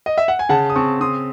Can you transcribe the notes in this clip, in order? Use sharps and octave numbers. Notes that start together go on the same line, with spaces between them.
D#5
E5
F#5
G#5
C#3 F#5 A5
D#6
C4 A5 C#6
C4 C6 D#6